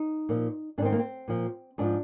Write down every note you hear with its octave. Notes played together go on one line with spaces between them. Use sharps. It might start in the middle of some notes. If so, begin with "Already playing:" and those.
Already playing: D#4
A#2 F3
G#2 D#3 C4 D4
A#3
C4
A#2 F3
G#2 F3 D4